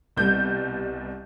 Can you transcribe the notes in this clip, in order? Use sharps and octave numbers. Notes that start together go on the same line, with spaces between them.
C2 B2 G3 G6